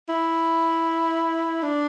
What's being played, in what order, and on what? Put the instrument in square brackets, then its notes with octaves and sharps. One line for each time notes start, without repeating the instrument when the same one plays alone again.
[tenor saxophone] E4
D4